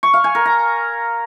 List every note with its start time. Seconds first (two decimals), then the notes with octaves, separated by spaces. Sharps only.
0.03 C#6
0.14 F5
0.24 G#5
0.35 A#4
0.45 A#5